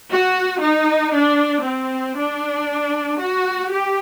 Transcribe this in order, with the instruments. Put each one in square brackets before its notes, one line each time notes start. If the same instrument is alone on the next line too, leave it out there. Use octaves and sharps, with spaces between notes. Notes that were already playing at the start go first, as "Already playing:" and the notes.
[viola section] F#4
D#4
D4
C4
D4
F#4
G4